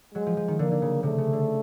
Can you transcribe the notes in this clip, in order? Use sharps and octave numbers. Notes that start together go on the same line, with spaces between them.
F#3 G#3
F3
F3
D#3
D3 A#3
D3
C#3
C3 A3
C#3
D3